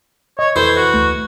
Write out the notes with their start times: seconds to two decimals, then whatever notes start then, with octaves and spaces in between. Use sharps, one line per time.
0.39 C#5 D#5
0.56 F2 E3 A4 C5 G#6
0.76 F#4
0.94 D2 A3